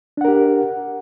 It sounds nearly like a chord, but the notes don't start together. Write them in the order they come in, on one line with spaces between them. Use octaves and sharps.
D4 F#5 A#4 G4